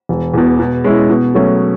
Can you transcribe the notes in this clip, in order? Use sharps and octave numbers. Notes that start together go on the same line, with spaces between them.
E1
E2 B2
B2
G#3 C#4 E4
B2
F#3 A3 C#4